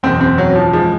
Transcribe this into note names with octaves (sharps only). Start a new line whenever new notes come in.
F#1 E2 B2 C4
C4
F#3
F3
E3 F3 G#3